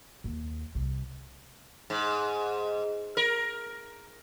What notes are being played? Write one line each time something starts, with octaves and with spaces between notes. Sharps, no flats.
D#2
C2
G#2
A#4